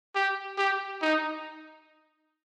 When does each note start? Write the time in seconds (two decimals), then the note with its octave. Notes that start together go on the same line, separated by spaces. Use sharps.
0.15 G4
0.58 G4
1.02 D#4